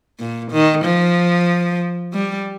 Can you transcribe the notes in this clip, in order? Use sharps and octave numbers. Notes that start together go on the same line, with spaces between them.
A#2
D#3
F3
G3